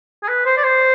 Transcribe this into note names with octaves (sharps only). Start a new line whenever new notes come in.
G#4
B4
C5
D5
C5